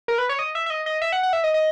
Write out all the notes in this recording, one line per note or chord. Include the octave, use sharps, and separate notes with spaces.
A#4
B4
C#5
D#5
E5
E5
D#5
D#5
E5
F#5
F#5
E5
D#5
D#5